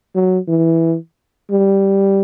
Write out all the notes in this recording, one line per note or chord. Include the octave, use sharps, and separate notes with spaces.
F#3
E3
G3